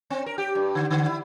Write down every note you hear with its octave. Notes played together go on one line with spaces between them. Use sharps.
C4
A#4
G4
G2
D3
D3
E4